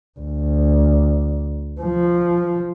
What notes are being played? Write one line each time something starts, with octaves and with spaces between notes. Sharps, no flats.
D2
F3